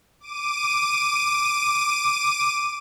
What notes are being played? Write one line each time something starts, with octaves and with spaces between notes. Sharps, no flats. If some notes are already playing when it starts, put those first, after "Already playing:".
D6 D#7